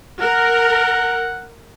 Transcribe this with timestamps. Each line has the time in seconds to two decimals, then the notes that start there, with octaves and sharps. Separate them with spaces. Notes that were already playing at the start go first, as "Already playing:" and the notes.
0.21 A#4 F#5